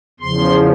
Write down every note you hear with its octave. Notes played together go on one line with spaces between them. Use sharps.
E2 C#3 F3 C6